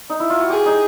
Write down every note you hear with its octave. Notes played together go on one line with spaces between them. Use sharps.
D#4
E4
F4
F#4
G4 G#4
D#4